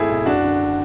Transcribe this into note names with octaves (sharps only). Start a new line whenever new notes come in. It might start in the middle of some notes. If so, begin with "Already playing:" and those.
Already playing: G#1 A3 E4 G#4
B1
F#1 D4 F#4
D3